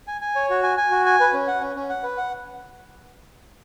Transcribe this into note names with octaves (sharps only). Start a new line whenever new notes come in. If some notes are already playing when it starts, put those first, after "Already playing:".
G#5
G#5
C#5
F#4
G#5
G#5
F#4
G#5
B4
C#4
F#5
C#4
C#4
F#5
B4
F#5